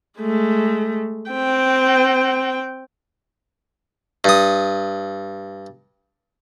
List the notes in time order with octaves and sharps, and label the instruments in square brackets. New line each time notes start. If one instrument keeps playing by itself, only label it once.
[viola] G#3 A3
C4 G5
[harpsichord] G2 D#6